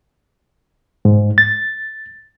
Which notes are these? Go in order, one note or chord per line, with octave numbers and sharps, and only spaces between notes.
G#2
A6